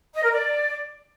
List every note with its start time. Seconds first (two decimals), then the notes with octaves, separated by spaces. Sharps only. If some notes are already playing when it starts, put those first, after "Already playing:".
0.14 D#5
0.23 A#4
0.32 D5